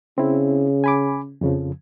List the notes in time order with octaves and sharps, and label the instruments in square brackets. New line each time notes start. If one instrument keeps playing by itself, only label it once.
[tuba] C#3 [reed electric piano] C4 E4
[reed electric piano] G#5 B5 D6
F2 C#3 F3